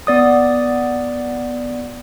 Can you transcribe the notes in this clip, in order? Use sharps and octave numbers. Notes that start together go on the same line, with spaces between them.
B3 D5 D#6